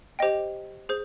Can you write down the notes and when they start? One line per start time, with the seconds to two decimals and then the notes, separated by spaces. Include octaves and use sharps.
0.19 G4 C5 D#5 G5
0.89 G#4 C5